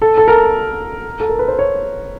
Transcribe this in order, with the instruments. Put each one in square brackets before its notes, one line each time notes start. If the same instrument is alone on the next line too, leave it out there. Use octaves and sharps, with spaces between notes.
[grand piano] A4
A4
A#4
A4
A#4
B4
C5
C#5